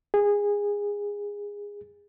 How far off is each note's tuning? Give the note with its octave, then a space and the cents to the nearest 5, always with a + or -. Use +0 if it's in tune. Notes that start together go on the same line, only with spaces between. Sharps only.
G#4 -20